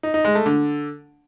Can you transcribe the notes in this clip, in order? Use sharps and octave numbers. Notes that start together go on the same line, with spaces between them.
D#4
D#4
G#3
A3
D3